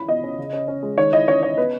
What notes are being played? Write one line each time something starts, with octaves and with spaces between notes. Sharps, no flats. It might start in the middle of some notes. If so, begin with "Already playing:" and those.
Already playing: C#4 E4 B5
B2 D#5
C#4
C#3
C#4
C#4
G#3
D#3 C#5
E4 D#5
C#4 C#5
C#4 C#5
B3 B4